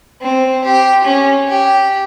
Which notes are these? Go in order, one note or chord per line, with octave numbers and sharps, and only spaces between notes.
C4
G4
C#4
G4